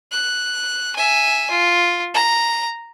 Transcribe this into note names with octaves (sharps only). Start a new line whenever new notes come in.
F#6
E5 G#5
F4
A#5